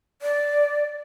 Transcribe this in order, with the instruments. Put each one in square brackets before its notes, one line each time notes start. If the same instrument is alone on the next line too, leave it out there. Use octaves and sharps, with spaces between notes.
[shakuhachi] D5